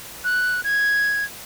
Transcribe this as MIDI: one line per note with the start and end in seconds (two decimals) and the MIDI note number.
0.24 0.61 90
0.64 1.24 92